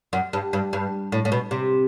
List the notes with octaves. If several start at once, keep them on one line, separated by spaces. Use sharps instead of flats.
F#2
G2
G2
G2
A2
A2
B2
C3